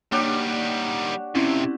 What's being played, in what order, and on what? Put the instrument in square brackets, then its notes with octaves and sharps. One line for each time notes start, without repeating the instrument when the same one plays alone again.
[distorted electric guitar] D#3 G3 [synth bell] A#3 C#5 G6 [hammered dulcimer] D4 F#4 G4
[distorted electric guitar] F2 C3 [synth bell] C4 C#4 E4